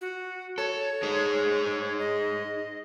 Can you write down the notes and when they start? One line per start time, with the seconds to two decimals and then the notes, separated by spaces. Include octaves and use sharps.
0.01 F#4
0.58 A4 C#5
1.03 D#4 G#4 C5
1.99 D#5